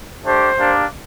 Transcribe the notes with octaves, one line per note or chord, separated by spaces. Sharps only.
A3 D4 G4 C5
A#3 D4 G4